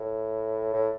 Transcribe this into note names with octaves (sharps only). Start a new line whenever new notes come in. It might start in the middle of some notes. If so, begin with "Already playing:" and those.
Already playing: A2
A2